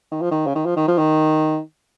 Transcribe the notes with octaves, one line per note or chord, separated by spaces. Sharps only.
D#3
F3
D#3
C#3
D#3
F3
D#3
F3
D#3